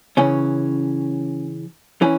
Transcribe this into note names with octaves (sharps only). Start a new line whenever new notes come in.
C#3 E3 C#4
E3 C#4